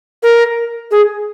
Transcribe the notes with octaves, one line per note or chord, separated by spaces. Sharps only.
A#4
G#4